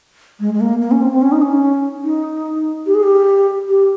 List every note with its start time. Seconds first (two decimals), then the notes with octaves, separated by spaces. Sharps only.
0.40 G#3
0.54 G#3
0.61 A#3
0.81 A#3
0.91 C#4
1.01 C4
1.12 C4
1.22 C#4
1.32 D#4
1.42 C#4
2.04 D#4
2.86 G4
2.94 G#4
3.03 G4
3.68 G4